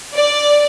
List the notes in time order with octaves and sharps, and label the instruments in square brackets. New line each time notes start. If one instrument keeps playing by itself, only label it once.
[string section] D5